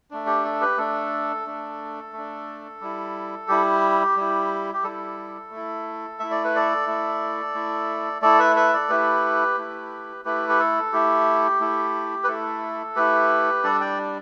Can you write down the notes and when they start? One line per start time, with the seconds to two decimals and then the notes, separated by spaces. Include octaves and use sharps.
0.11 A3 D4
0.26 G4
0.45 A4
0.60 G4 B4
0.78 A3 D4 A4
1.46 A3 D4
2.13 A3
2.18 D4
2.81 G3 E4
3.48 G3 E4 G4
4.17 G3 E4
4.73 G4
4.83 G3 E4 A4
5.51 A3 E4
6.20 A3 E4 E5
6.31 D5
6.44 B4
6.55 A4 D5
6.86 A3 E4
7.54 A3 E4
8.22 A3 E4 A4 D5
8.39 B4 E5
8.56 B4 E5
8.73 A4 D5
8.89 A3 E4 G4 B4
9.58 A3 E4
10.25 A3 E4 G4 B4
10.49 G4
10.60 A4
10.93 A3 E4 G4
11.61 A3 E4
12.24 B4
12.28 A3 E4 A4
12.96 A3 E4 G4 B4
13.64 G3 D4 A4 D5
13.81 D5 G5